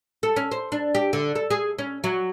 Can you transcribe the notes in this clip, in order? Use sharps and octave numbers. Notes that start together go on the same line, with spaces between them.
A4
C#4
C5
D4
G4
D3
A4
G#4
C#4
F#3